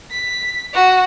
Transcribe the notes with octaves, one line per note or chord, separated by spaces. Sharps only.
B6
F#4